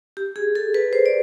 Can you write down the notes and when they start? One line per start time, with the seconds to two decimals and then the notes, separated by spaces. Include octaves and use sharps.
0.17 G4
0.36 G#4
0.55 A4
0.74 B4
0.93 C5
1.06 D5